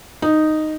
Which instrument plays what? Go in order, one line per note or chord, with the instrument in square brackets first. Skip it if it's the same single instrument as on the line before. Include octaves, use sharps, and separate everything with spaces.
[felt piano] D#4